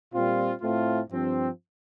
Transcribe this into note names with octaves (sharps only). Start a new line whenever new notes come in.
A#2 G3 C4 F4
A2 A3 C4 F4
G2 F3 C4